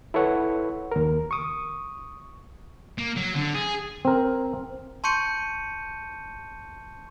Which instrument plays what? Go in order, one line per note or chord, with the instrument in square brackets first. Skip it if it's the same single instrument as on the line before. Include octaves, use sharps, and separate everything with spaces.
[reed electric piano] E4 A4 B4 C#5 F#5
D#2 A#4
C#6 D#6
[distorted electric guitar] A#3
F#3
D3
G#4
[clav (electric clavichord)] C4 A#4
[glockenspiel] A5 C6 C#6 G6 C#7 D#7